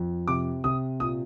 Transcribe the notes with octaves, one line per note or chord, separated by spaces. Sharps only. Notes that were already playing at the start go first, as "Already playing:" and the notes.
Already playing: F2
C3 D6
C3 D#6
A#2 D#6